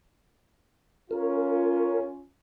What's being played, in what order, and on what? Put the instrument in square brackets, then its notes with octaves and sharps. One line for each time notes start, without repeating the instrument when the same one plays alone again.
[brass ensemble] C#4 F4 [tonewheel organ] A#4